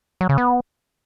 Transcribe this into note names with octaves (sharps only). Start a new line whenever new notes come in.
F#3
C#3
B3